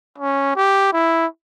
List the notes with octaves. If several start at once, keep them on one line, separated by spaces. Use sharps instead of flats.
C#4
G4
E4